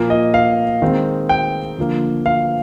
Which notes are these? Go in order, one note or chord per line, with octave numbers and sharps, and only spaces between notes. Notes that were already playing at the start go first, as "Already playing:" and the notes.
Already playing: A#2 F3 A#3
D#5
F5
D#3 G#3 C4
G5
D3 F3 A#3
F5